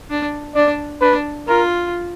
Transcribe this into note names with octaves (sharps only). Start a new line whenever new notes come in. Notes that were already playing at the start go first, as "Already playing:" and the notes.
D4
D4 D5
D4 B4
F4 A#4